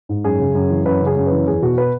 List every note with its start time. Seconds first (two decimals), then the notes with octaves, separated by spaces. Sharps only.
0.09 G#2
0.24 F#2 G#4
0.39 C#3
0.55 F#2
0.70 E3
0.85 F#2 B4
1.01 C#3
1.06 G#4
1.16 F#2
1.27 B4
1.32 E3
1.47 E2 G#4
1.62 B2 F#4
1.78 B4